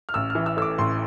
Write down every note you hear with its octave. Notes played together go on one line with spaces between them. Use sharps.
F6
A1 E6
F6
E3
E6
A2 E6
D6
A1 C6